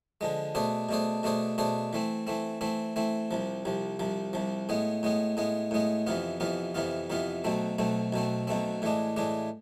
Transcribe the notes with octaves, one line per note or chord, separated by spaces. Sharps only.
D3 F3 G#3
B2 A3 D4 G#4 C5
B2 A3 D4 G#4 C5
B2 A3 D4 G#4 C5
B2 A3 D4 G#4 C5
E3 A3 C4
E3 A3 C4
E3 A3 C4
E3 A3 C4
C2 C3 F3
C2 C3 F3
C2 C3 F3
C2 C3 F3
A2 G#3 B3
A2 G#3 B3
A2 G#3 B3
A2 G#3 B3
F2 C3 E3 B3 F4
F2 C3 E3 B3 F4
F2 C3 E3 B3 F4
F2 C3 E3 B3 F4
B1 B2 A3 C4
B1 B2 A3 C4
B1 B2 A3 C4
B1 B2 A3 C4
A2 E3 G#3 D4
A2 E3 G#3 D4